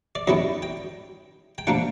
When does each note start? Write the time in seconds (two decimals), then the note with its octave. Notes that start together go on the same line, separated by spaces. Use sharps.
0.15 D5
0.27 F#2 D#3 G3 B3 E4 D#5
0.62 G5
1.58 G5
1.67 A#2 F3 A#3 D4 F#5